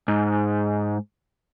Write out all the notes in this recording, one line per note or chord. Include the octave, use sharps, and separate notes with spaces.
G#2